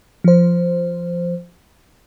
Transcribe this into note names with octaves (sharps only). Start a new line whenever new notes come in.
F3 C5